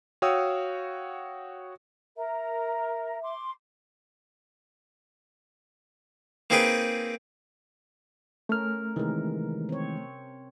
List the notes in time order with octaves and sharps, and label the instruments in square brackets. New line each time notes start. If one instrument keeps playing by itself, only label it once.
[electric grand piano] F#4 C#5 F5 G5 D#6 E6
[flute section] A#4 [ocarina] E5
[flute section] C6 D6
[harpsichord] A#3 C4 D#4 G#4 B4 G5
[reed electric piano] A3 F6 [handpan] C#4 A#4
[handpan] C3 A#4 [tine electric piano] D#3 E3 G#3
[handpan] C4 C#5